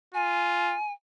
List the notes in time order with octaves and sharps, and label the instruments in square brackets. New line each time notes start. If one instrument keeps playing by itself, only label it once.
[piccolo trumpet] F4 [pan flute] G#5